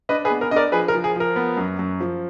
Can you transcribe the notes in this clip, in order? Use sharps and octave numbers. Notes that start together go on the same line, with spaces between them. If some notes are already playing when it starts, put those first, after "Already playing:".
D4 B4 D#5
G#4 B4
B3
A#4
D4 D#5
A#4 D5
F3 G#4 B4
A#4
F3
G#4
F3 A#4
B3
F#2
F#2
F3